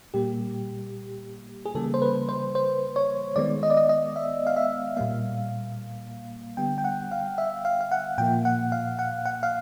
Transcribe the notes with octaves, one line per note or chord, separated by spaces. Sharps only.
A#2 G3 A#3 G4
G#4
C#3 E3 G3 A#3 A4
C5
B4
C5
C5
C#5
D#3 G#3 B3 D5
D#5
D5
D#5
D#5
E5
F5
E5
A#2 G3 A#3 F5
D3 G3 B3 G5
G5
F#5
F5
E5
F5
F5
F#5
A#2 F3 A#3 G5
F#5
F5
F#5
F#5
F5